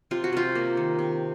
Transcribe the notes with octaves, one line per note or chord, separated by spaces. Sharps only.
C3 F4
F#4
C3 F4
A#3
D#3
C3